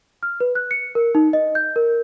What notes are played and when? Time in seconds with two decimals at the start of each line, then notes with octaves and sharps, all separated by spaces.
0.23 F6
0.40 B4
0.55 F#6
0.71 C#7
0.95 A#4
1.15 D#4
1.33 D#5
1.55 G6
1.76 A#4